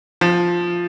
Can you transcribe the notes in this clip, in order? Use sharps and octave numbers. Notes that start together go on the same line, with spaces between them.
F3